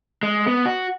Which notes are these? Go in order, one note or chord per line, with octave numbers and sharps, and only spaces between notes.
G#3
B3
F#4